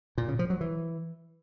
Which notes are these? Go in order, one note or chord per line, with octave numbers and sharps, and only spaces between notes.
A#2
C#3
F3
F#3
E3